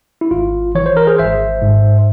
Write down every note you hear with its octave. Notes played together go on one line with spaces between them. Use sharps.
E4
G#1 F4
E3 C#5
C5
A#4
G#4 C5
G#1 C5 E5
G#2